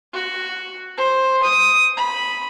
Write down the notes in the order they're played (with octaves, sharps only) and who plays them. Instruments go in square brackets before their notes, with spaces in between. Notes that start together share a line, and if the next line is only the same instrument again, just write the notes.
[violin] F#4
C5
D#6
B5